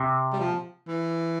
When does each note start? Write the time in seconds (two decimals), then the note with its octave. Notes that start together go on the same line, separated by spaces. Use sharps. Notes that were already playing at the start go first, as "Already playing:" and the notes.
Already playing: C3
0.33 G3
0.40 F3
0.87 E3